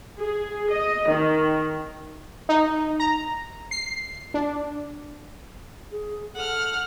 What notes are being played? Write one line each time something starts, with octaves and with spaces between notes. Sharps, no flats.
G#4
D#5
D#3
D#4
A#5
C7
D4
G#4
A4 F#5 F6